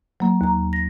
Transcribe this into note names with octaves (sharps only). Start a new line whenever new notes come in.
F#3 A#3
D#2 A#5
A#6